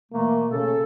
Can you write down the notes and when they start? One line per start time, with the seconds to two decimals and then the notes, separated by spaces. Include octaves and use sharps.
0.12 B2 E3 A3 A#3
0.52 C#3 A4